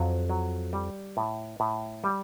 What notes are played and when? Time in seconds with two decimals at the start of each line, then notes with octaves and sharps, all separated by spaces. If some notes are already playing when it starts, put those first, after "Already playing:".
Already playing: F2 F#3
0.29 F#3
0.73 G3
1.17 A2
1.60 A2
2.04 G3